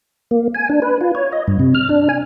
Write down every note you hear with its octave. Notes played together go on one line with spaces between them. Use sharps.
A#3
G#5
D4
B4
F4
C#5
D#5
G2
C3
F6
D4
G#5